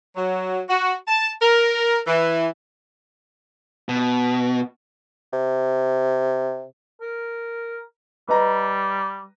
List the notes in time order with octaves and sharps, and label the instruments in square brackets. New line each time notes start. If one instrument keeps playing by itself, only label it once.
[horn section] F#3
F#4
A5
A#4
E3
[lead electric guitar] B2
[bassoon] C3
[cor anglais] A#4
[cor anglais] G3 [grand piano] B4 D#5 A#5